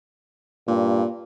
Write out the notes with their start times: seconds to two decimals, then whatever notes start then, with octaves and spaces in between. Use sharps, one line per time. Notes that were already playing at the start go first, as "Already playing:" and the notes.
0.68 G2 A#2